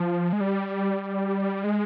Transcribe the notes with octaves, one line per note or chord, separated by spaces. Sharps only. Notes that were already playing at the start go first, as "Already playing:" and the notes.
Already playing: F3
G#3
G3
G#3